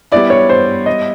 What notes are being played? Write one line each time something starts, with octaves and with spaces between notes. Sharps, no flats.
G3 B3 E4 D5
C#5
C5
D#5